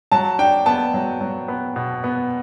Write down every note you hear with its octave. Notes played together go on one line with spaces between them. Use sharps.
F#3 A5
D4 G5
B3 A5
F#3
F#3
B3
B2
B3